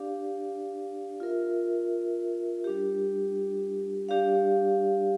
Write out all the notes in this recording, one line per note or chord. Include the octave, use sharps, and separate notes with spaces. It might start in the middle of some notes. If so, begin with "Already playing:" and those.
Already playing: D4 G4 D5 F5
F4 A#4 E5
G3 D4 G4
G3 D4 G4 D5 F5